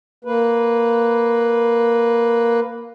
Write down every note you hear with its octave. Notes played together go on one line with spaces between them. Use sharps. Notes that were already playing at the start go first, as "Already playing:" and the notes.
A#3 B4